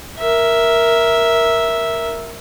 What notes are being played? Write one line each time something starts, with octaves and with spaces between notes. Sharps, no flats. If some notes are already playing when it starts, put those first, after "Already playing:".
A#4 E5